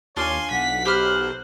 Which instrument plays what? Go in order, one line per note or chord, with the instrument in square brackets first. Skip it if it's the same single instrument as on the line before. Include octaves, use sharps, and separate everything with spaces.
[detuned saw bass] D#2 [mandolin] D4 F4 D6 [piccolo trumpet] C#5 [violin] G#5 C6
[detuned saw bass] B1 [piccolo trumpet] F#5 [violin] B6
[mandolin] G4 B5 F6 [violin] C5 [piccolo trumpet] F#6